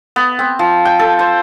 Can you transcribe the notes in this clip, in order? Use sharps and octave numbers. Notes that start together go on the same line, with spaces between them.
B3
C4
F3
G5
A4
C5